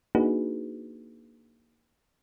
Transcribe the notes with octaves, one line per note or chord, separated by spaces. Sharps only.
A#3 D4 D#4 F#4 G#4 B4